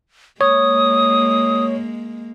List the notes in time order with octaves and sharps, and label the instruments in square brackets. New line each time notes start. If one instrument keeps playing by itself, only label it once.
[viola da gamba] G#3 A#3 [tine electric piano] C#5 [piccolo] D#6